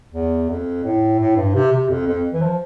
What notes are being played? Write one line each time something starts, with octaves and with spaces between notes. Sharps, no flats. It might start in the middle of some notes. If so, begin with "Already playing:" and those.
E2
F2
A2
A2
G2
C3
C3
F2
F2
E3
F3